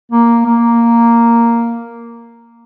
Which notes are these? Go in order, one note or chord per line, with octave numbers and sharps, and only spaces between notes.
A#3
A#3